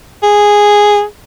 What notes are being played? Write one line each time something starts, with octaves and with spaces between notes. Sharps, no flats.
G#4